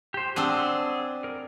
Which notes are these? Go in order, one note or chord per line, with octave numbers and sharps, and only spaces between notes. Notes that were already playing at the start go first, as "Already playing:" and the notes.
G4 C5
C4 D4 G#4 F#5 E6
A#4